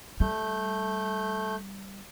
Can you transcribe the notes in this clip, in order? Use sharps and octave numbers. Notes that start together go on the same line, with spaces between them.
G3 A3 G6